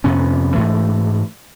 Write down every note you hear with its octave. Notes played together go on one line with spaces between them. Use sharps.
F2 C3 B3 C#4
G#2 E3 A3